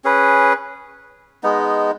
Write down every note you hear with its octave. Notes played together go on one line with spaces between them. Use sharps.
C#4 G#4 B4
G#3 B3 D#4